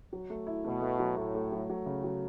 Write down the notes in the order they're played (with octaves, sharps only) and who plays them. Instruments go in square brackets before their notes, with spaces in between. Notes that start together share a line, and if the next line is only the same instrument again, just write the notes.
[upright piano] F#3
A3
E4
[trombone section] B2 [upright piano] A3
[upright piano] A3
F#3
[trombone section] A2 [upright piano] A3
[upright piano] A3
F#3
F#3
C#3
F#3